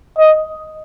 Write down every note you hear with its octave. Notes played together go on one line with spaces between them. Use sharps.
D#5